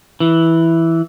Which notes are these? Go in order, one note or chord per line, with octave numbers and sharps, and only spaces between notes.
E3